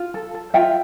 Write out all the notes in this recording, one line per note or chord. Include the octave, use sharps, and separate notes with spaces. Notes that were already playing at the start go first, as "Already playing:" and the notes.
Already playing: F4
A4
A4
F4 E5 G5